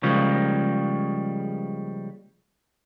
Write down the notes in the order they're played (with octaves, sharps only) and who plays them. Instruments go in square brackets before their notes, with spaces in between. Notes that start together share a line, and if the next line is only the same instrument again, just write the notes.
[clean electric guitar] C#3 F3 G3 G#3 A#3